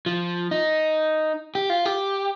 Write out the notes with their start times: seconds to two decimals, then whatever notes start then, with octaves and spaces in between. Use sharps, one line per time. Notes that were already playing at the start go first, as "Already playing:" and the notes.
0.06 F3
0.51 D#4
1.55 G4
1.70 F4
1.85 G4